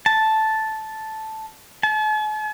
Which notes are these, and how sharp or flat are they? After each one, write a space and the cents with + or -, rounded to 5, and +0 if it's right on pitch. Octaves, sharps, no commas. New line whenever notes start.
A5 -5
A5 -45